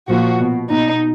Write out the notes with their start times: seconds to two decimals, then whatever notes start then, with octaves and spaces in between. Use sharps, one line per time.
0.08 A#2 F3 F#4
0.39 B2
0.70 B2 D#4